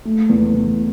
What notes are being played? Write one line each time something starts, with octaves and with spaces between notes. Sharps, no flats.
A3
E2
E2